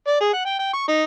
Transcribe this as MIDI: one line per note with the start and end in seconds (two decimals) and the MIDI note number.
0.07 0.16 74
0.21 0.28 68
0.33 0.45 78
0.46 0.58 79
0.59 0.71 79
0.74 0.87 85
0.88 1.03 63